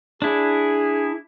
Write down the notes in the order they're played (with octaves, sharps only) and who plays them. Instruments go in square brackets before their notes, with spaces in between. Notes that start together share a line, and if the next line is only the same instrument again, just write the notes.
[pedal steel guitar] D4 E4 [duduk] G#4